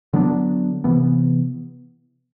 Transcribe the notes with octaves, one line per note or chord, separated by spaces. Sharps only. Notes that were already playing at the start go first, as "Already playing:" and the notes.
D3 F#3 B3 D4
C3 E3 B3